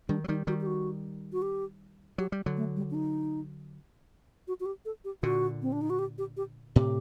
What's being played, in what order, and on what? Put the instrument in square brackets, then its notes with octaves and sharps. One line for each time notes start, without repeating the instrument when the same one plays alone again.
[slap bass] D#3 G3 [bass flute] D4
[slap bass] F#3
[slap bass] D#3 G3 [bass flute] D#4
[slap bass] D#3 G3 [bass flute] F#4
[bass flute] G4
F#4
F#4
G4
[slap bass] F#3 [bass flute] G4
[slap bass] G3
D3 F#3
[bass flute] A3
G3
D4
D#4
F#4
F#4
G4
A4
G4
[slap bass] A#2 D3 [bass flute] F#4
[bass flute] C4
D4
D#4
F#4
G4
G4
G4
[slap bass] A2 C3 [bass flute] G4